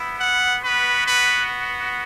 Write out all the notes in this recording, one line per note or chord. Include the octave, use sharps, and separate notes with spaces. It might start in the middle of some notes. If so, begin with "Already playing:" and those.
Already playing: B3 E4
F#5
B3 F#4 B4
B4